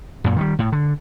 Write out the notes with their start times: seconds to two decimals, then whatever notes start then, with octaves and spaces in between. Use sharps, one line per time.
0.24 F#2 A#2
0.37 D#3 F#3 G3
0.59 A2
0.72 D3